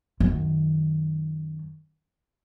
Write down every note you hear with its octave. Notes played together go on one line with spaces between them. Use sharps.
F#2 D#3